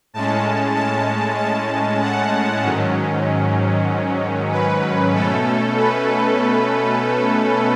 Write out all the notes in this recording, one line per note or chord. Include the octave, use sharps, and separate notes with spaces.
A2 G#3 C#4 A5
A5
A5
F#5
G#2 D#3 F#3 C#4
B4
B2 A3 C#4 A4
B4